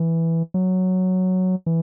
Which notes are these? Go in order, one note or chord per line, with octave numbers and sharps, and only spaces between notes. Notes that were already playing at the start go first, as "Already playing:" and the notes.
Already playing: E3
F#3
E3